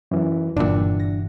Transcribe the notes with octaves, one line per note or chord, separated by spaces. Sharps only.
F#2 E3
F#1 G2 A#2 E3 D4 F#4
A#6